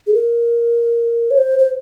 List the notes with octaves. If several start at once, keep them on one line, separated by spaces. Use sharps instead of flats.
G#4
A#4
C#5
C5
C5